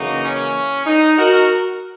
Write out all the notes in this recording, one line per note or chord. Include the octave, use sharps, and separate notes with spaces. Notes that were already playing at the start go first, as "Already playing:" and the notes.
Already playing: F#2 C#3 E3 A#3 D#4 F#4
C#4
D#4
F#4 A#4